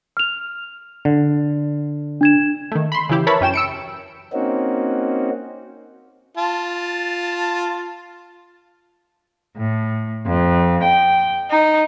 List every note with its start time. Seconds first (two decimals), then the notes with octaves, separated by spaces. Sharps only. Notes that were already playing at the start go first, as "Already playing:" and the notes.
0.17 F6 F7
1.05 D3
2.21 D4 G#6 E7
2.72 D#3 A3
2.92 B5 C6
3.09 C#3 E3 E4 G4
3.27 A#4 B4 C#5 E5 A5 B5
3.41 F#2 C#4 G5 E7
3.54 E6 C#7 D7
4.33 A#3 C4 C#4 D#4 F#4
6.37 F4 A5
9.57 A2
10.25 F2
10.83 G5
11.49 D#4